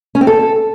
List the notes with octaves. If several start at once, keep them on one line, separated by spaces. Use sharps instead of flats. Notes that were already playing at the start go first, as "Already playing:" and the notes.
C#4
C4
A4